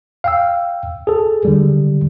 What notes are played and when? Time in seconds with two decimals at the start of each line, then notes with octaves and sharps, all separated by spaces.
0.24 F5 G5 E6
1.07 G#4 A4
1.45 D3 G3